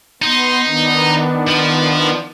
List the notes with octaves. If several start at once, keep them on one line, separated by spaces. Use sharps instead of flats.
B3 D#4 C6
D#3 B3 D4
F3